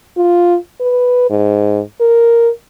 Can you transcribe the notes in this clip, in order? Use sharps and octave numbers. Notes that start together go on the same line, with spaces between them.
F4
B4
G#2
A#4